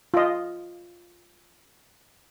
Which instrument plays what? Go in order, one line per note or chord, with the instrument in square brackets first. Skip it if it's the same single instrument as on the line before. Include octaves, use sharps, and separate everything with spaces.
[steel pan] F4 D#5